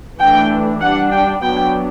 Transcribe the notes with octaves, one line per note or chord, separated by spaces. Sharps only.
E3 A3 D4 G5
G3 D4 F#5
G5
F#3 B3 D4 G5